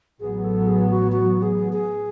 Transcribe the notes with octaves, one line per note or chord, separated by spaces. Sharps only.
A1 A2 F#3 B3 G#4
A4
G#4
F#4
F#4
G#4
G#4